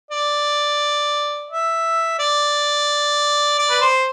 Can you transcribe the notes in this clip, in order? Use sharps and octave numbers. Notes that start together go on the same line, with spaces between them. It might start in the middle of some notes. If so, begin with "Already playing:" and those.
D5
E5
D5
D5
B4
C5